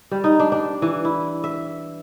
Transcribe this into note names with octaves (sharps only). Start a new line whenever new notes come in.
G3
D#4
D4
D4
E3
E4
E5